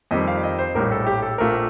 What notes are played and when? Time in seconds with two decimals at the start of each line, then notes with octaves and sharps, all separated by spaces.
0.11 F2 D#3 G3 C4 D#5
0.27 F5
0.43 D#5
0.59 C5
0.75 A#1 A2 G3 A#4
0.92 A4
1.06 G4
1.22 A4
1.38 A#1 A#2 A3 C4 A#4